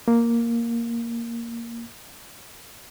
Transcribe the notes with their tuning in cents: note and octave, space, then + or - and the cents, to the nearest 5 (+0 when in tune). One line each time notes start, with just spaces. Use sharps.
A#3 +0